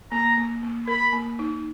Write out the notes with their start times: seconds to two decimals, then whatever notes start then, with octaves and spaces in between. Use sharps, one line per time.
0.12 A#3 A#5
0.37 A#3
0.63 A#3
0.87 A#4 B5
1.13 A#3
1.39 D#4